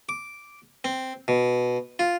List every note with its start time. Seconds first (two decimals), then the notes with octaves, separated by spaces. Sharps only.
0.09 D6
0.84 C4
1.28 B2
1.99 F4